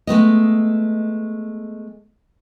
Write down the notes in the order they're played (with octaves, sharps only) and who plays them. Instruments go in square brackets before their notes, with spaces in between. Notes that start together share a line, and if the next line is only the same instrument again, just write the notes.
[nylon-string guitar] G#3 A3 B3 D#5